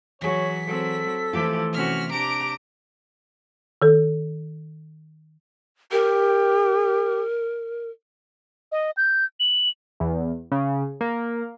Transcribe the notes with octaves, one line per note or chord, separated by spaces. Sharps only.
E3 F#3 G#4 C#5 B6
F#3 C4 A4
E3 F3 A3 E4 F4 G4
C3 C#4 F#4 F6 B6
D4 G4 A#5 D7
D#3 A4
G4 A#4
D#5
G6
F#7
E2
C#3
A#3